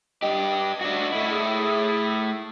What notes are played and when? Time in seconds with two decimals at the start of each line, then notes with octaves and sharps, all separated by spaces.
0.22 G2 G4 D#5
0.81 D4 F#4
1.12 A3 E4
1.31 G#4